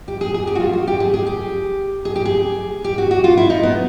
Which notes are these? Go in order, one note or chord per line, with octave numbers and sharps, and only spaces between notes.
G4
G#4
G#4
G4
F#4
F4
F#4
G4
G#4
G#4
G4
G#4
G4
G#4
G4
F#4
F#4
F4
E4
D#4
B3